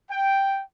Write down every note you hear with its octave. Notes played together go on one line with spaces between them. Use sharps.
G5